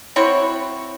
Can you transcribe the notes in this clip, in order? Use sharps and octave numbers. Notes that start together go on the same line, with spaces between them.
C4 E4 F#4 C#5